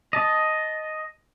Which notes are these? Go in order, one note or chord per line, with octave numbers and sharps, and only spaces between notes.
D#5 A5